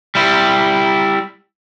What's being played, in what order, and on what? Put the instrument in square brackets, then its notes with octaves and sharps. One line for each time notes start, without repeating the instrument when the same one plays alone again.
[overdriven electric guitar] G3 E4